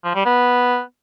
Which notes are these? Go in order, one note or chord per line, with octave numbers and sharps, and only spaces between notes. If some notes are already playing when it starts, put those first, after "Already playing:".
F3
G3
B3